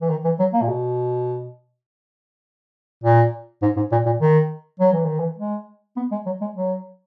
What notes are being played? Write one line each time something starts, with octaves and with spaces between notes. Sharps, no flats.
E3
D#3
E3
F#3
A#3
A#2
B2
A#2
G#2
G#2
A#2
A#2
D#3
F#3
E3
D#3
E3
G#3
B3
G#3
F#3
G#3
F#3